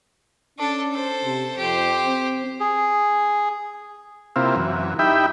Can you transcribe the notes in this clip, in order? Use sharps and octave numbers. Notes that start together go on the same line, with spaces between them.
C#4 D4 A4
A4 C5
C3
F2 G4 C5
C4
G#4
C3 A#3 C4 E4 F4
F#2 E3
D#4 E4 G4 E5 G5 B5